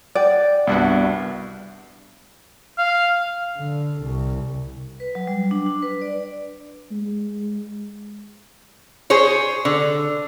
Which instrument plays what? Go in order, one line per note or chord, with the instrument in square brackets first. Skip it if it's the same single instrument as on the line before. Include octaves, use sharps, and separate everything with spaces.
[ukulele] D5 [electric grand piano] F#5 G5
[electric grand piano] C2 G2 [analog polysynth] B3 D4 F#4
[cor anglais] F5
[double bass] D3
C2
[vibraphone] B4
F#3
G3
D4
D4
B4
D5
[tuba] G#3
[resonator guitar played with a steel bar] G#4 C5 C#5
D3